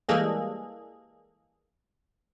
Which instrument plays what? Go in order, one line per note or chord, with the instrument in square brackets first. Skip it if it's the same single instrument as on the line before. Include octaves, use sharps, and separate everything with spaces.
[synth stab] E3 G3 G#3 A#3 G#4 A4